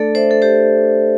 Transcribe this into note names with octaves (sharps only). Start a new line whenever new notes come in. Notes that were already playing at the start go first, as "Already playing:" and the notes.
Already playing: A3 D4 A4 D5
C5 E5
A4
G4 C5